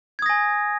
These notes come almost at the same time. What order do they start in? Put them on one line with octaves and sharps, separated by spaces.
G#6 D#6 A#6 G#5